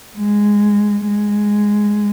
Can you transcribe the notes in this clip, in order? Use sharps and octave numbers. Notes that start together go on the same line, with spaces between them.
G#3
G#3